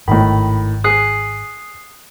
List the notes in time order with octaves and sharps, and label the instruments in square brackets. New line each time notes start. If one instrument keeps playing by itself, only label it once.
[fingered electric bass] G#1 [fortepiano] A2 D#3 [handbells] B5
[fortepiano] G#4 G#5 [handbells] D#6 F#6 C7